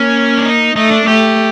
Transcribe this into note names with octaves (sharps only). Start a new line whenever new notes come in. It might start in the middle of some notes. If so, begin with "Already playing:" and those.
Already playing: A#3 C#4
D4
D#4
A3 D#4
D4
A3 G4